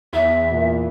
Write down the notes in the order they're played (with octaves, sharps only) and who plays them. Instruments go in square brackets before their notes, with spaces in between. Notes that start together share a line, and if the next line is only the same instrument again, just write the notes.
[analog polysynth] E2 [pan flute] E5
[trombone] A#2